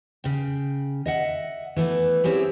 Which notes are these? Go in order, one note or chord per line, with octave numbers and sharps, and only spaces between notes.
C#3 G5
D#5 E5 F#5
E3 A3 B3
C4 C#4 E4 G4 G#4